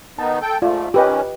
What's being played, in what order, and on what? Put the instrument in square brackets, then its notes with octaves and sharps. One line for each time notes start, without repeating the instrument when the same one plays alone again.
[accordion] D#3 B3 D#4 [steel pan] A5
[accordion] A4 G5
[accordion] G#2 F3 A3 [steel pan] F4 D5
[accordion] D#3 C#4 [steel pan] G4 B4 D#5